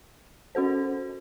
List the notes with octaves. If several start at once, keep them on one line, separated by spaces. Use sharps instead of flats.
C#4 F#4 A4 C5